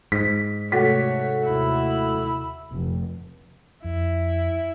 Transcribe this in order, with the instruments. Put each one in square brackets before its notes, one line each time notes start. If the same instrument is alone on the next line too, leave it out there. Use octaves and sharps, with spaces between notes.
[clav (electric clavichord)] G#2 [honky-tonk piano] B6
[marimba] C3 D6 A6 [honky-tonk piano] A3 F#4 B6 [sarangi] C#5
[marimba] D#2 C3 [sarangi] E4
[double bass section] F1
[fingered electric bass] F2 [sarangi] E4